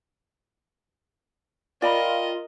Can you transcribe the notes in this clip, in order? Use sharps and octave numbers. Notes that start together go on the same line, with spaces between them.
F4 A#4 D5 D#5 G5 B5